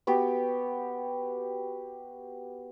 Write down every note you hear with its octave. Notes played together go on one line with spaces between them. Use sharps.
B3 F#4 G4